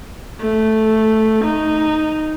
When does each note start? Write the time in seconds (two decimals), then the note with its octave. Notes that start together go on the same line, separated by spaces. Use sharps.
0.40 A3
1.44 D#4